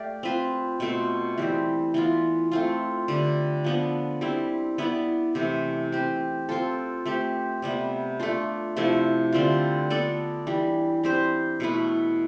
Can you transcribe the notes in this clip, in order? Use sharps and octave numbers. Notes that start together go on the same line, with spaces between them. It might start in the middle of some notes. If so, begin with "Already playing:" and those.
Already playing: A3 G4 D5 F5
C4 F4 B4
B2 A3 C4
E3 G3 C4
E3 B3 F4
A3 C4 F4
D3 G3 D4
F3 B3 D4
G3 C4 E4
B3 E4 B4 D5
C3 E3 A3
C4 G4 B4
C4 F4 A4
A3 C4 G4
C3 G3 B3
A3 D4 F4
C3 F3 A3 E4
D3 G3 C4 F4
B3 D4 A4 D5
E3 G3 D4
G3 C4 G4 C5
B2 A3 E4 B4